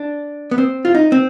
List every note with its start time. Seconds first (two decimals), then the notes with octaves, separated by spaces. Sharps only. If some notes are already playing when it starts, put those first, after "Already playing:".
Already playing: D4
0.51 B3
0.58 C4
0.85 F4
0.95 D#4
1.12 C4